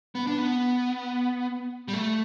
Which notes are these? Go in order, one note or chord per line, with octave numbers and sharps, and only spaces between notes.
B3
D4
B3
G3
A3